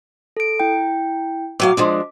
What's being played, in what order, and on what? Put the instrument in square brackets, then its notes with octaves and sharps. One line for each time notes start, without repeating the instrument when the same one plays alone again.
[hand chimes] A4 D7
E4 G5
[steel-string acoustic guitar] A2 F#3 F5 [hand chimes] D6
[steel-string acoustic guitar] F3 G#3 D4